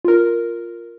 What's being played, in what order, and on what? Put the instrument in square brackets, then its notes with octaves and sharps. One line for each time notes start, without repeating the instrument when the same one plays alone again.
[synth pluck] F4 A#4